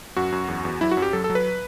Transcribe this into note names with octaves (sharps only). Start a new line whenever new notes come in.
F#2 F#4
F#2
E2
E2
F#3 E4
F#4
F#2
G4
F#3 A4
A4
F#3
B4